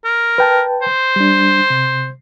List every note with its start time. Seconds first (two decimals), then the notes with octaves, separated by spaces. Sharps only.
0.05 A#4
0.38 B4 G5 A5
0.82 C5
1.16 G3 D4
1.70 C3